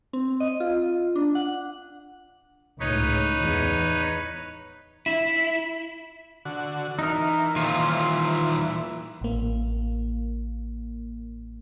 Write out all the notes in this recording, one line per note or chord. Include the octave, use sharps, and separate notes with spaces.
C4
D#5
F4
D4
F#5
C#2 A2 D#4 B4 C#5
E2
E4
D3 F#4
E3 D#4 A#4
D#2 A#2 F4
A1 A#3